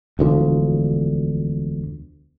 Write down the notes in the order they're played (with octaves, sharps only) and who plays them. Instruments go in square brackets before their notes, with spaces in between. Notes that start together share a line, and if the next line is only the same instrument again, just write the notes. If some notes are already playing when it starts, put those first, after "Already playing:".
[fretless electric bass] E1 D2 D3 F3